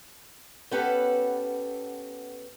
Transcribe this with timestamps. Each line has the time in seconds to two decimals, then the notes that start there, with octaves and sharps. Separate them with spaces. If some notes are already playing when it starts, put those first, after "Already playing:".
0.71 B3 C#4 G4 A4 B4 F#5